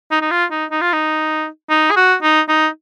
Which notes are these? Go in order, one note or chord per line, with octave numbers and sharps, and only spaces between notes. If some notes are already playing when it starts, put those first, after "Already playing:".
D#4
D#4
F4
D#4
D#4
F4
D#4
D#4
G#4
F#4
D#4
D#4